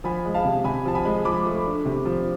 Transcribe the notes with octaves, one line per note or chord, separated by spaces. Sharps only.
F3 G#5 B5
G#3
F5 A5
C3
C3 G#5 B5
F3 A5
G#5 B5
G#3
F3 B5 D6
A3
D4
C3
F3